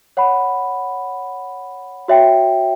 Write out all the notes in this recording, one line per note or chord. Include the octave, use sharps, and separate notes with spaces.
C#5 F#5 B5
F#4 C#5 E5 G5